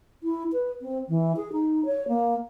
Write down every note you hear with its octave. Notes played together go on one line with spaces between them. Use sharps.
E4
B4
C4
E3
G#4
D#4
C#5
A#3